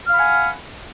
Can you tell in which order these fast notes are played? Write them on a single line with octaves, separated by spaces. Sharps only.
F6 F5 B5 F#5 G#5